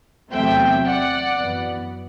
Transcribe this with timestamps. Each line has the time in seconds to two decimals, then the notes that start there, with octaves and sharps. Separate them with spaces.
0.31 E2 C3 F#3 A3 C4 E5 G5
0.84 D5 F#5
1.38 F#2 E3 B3